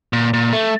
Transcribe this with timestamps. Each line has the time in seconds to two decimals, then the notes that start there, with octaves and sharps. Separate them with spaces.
0.13 A#2
0.33 A#2
0.53 A3